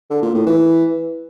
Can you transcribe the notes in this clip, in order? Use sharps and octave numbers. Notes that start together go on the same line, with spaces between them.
D3
A#2
A2
E3